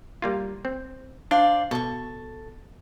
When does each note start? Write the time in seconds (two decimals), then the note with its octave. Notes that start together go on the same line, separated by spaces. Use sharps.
0.22 G3 A#3 F4
0.65 C4
1.31 D4 C5 D5 F5
1.71 B2 A4 C#6